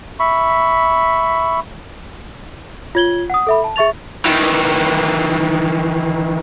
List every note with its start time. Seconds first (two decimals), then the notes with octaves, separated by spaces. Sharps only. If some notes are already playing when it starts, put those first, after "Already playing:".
0.20 E5 B5 C#6
2.95 F4 C#5 G#6 F#7 G7
3.30 F#5 D#6
3.47 A4 E5 B5
3.64 A5
3.76 G#4 E5 C#6 A6 F7
4.25 D#3 E3